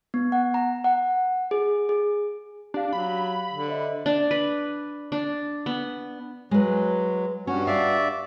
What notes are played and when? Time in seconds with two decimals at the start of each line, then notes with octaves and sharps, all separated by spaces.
0.14 B3
0.32 F#5
0.54 A#5
0.84 F#5
1.51 G#4
1.89 G#4
2.74 D4 G4 F5
2.93 F#3 B5
3.52 D3
3.68 C5 D#5 E5
4.06 D4
4.31 B4
5.12 D4
5.66 B3
6.51 F#3 G#3 B4
7.47 G2 C#4 F#4
7.67 D5 E5 F5